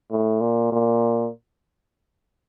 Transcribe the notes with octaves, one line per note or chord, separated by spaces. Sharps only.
A2
A#2
A#2